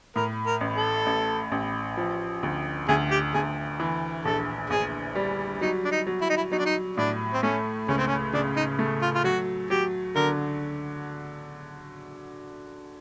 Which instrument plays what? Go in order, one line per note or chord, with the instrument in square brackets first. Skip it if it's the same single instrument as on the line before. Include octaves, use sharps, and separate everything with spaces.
[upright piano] A2 [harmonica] A#4
[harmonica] A#4
[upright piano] A1
[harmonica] A4
[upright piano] A1
A1
F3
D2
[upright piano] D2 [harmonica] G#4
[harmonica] G4
[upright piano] D2 [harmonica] G#4
[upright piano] E3
[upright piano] A#1 [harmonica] A4
[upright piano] A#1 [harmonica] G#4
[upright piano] G3
[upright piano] F#3 [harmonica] D#4
[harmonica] D4
D#4
[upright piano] F#3
[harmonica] E4
D#4
E4
[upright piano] F#3 [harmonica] D#4
[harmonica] D4
D#4
[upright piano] A2 [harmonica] D4
[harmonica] C4
[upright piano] A3 [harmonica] C#4
[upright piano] C#2 [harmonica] C#4
[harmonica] C4
C#4
[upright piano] C#3 [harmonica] D4
[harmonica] D#4
[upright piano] A3
[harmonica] F4
F4
[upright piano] F#3 [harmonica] F#4
[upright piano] F#3 [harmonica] G4
[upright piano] D3 [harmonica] A#4